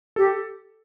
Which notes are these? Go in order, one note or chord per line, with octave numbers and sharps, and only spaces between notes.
G4 A4